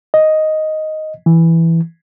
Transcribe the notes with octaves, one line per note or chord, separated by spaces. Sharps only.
D#5
E3